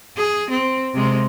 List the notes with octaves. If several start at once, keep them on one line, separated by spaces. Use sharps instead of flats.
G#4
C4
C3 G#3